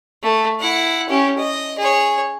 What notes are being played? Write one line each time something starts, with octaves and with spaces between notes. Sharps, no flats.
A3
E4 F#5
C#4 G4
D#5
G#4 C#5